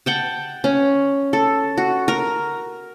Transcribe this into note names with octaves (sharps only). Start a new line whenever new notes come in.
F#5 G5 A5
C#4
A4
F#4
A#4